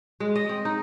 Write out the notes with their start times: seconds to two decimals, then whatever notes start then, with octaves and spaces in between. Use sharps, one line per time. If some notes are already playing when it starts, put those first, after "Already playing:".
0.20 G#3
0.36 D#5
0.49 C4
0.65 D#4